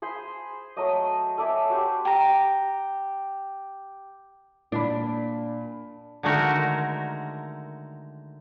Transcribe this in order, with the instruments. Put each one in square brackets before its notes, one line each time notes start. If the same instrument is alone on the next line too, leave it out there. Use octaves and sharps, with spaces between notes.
[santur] G#4 C5 B5 C6
F#3 A3 D#5 D#6
A4 D5 E5 G#5
F#4 G4 C5
[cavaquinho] G4 A#5
[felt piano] A#2 B5 [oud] D4
[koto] D3 D#3 G#3 A3 F#4 A#4